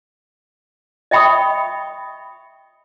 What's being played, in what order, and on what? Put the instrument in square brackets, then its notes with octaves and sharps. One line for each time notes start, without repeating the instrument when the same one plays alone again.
[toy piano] D#5 E5 G5 B5 C#6 D#6